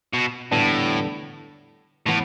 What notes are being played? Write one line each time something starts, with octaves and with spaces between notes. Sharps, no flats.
B2
E2 A2 D3 G3 B3 D4
A2 E3 B3